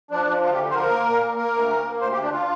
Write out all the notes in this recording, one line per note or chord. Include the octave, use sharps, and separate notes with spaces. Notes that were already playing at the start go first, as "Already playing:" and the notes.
F3 D4
F3
D2 F4
G4
D3
C5
F3 A#4
A#3
A#2
A#3
A#3 A#4
D2
A#3
A#3
D2 C5
G4
D2
D4
F4